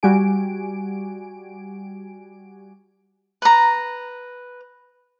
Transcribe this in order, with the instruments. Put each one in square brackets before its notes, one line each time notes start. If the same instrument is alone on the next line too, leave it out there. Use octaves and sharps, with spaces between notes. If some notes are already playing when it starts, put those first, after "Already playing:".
[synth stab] G3 F#4 G4 G#5 D7
[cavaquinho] B4 A#5